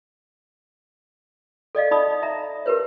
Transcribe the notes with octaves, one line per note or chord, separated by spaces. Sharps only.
A4 D5 D#5 F5
D#4 D5 B5 D#6
E5 A#5
G4 A#4 B4 C#5